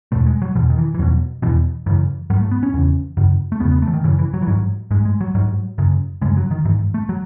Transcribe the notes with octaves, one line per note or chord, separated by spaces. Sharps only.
E2 B2 A3
G#3
F#3
E2 B2 E3
D#3
E3
E3
E2 B2 F#3
E2 B2 E3
F#2 C#3 E3
G#2 F#3
A3
B3
C#4
E2 C#3
F#2 C#3
A3
E2 C#3 B3
B3
A3
E3
D#3
F#2 C#3 E3
E3
F#3
E3
G#2 F#3
G#2 G#3
G#3
F#3
G#2 F#3
F#2 C#3
F#2 C#3 G#3
F#3
D#3
G#2 E3
A3
F#3